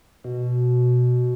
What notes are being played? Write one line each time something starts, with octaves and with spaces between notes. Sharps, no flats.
B2